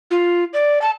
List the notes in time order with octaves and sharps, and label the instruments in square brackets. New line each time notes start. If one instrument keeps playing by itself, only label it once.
[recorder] F4
D5
A5